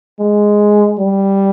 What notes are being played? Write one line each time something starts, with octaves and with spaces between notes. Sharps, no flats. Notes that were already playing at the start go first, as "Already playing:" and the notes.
G#3
G3